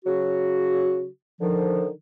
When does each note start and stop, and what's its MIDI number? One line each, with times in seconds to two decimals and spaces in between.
0.05 1.07 49
0.05 1.07 54
0.05 1.07 66
1.41 1.88 50
1.41 1.88 51
1.41 1.88 53